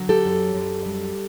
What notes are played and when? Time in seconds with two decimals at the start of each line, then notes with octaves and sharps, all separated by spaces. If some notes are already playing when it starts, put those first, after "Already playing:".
Already playing: D3 F#3
0.09 G4 A4
0.25 F#2
0.54 F#2
0.86 G3